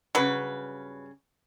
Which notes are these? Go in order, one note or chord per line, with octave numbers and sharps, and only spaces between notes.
G2 C#3 F#3 B4